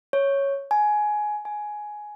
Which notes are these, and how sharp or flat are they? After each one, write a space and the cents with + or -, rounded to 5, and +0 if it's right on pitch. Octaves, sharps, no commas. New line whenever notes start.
C#5 +0
G#5 +15
G#5 +10